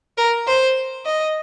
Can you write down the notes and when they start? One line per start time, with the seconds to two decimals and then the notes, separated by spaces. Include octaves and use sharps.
0.18 A#4
0.47 C5
1.05 D#5